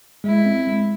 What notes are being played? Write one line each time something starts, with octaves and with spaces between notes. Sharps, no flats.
G#3 E4
C4
G#3